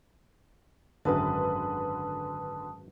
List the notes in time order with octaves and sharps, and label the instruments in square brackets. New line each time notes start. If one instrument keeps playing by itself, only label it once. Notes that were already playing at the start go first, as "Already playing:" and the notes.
[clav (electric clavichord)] G#1 F#2 [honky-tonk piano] D3 B4 [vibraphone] A5 D#6